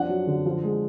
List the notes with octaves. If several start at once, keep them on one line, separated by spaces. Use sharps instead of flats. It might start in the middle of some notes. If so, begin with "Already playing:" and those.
Already playing: F3 D4 F#5
F#3
D3
F3
G#3